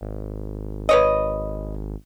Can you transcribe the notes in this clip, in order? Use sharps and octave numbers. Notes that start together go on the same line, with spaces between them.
G#1
B4 C#5 D#5